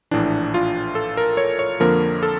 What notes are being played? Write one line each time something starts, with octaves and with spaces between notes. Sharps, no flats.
A#1 A2 E3 D4
F4
A4
A#4
C#5
C#5
F2 D3 F3 A#3 A#4
A4